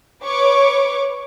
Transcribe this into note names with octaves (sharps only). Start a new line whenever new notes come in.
B4 C#5 C#6 D6